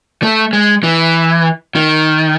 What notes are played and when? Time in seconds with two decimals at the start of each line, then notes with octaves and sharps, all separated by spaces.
0.23 A3
0.53 G#3
0.83 E3
1.75 D#3